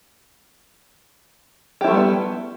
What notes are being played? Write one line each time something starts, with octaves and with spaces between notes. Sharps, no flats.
G3 A3 B3 E4 G4